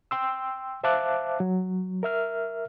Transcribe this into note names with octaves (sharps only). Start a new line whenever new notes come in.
G5 C6 E6
C5 E5 F5 A5 D6 F#6
F#3
A#4 E5 F6